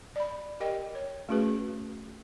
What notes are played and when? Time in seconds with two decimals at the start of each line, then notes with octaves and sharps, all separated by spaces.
0.16 D5 B5
0.60 G4 A#4 D#5 G5
0.95 C#5
1.29 A3 C#4 F#4 G#4 B4